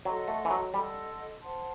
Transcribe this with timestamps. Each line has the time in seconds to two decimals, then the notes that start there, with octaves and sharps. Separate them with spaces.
0.05 F#3 A4 D#5 F#5 C6
0.28 A3
0.45 E3
0.50 F#3
0.74 G3 A4 D#5 F#5 C6
1.41 C5 F#5 A5 C6